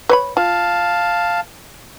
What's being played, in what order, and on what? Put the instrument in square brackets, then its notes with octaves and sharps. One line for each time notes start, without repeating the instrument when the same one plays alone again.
[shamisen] B4 C#5 B5
[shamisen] F4 [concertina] F5 A5